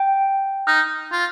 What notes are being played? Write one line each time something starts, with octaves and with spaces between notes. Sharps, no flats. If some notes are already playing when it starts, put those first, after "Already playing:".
Already playing: G5
D#4 F6
F4